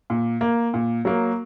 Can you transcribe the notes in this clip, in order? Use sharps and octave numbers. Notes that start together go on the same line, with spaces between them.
A#2
A#3
A#2
F#3 A#3